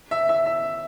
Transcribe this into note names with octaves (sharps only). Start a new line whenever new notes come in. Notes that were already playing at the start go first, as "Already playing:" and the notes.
E5
E5
E5